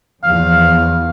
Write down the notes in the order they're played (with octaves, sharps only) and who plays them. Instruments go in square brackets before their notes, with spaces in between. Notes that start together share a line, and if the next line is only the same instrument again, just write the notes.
[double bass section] E2 F3 [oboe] F5